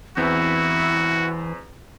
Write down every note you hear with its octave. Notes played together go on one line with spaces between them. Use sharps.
E2 E3 C4 E4 F#4 G6